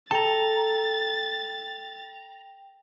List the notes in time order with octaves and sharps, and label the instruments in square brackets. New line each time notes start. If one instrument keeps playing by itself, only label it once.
[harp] A4 [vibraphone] G5 [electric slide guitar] A5 A#5 [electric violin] A6